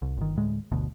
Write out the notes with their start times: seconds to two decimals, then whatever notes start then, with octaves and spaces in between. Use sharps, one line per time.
0.02 C2
0.17 G1 D#3
0.37 D2 A2 G#3
0.71 G1 D2 B2